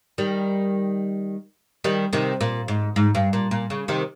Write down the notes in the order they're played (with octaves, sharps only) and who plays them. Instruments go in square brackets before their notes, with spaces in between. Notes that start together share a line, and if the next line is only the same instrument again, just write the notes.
[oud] D#3 G3
D#3 G3
C3 D#3
A#2
G#2
G#2
G2
A#2
A#2
C#3
C3 D#3